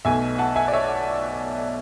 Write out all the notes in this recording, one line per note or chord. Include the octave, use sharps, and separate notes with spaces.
B1 B2 A3 E5 G#5
F#5 A5
E5 G#5
D5
C#5 E5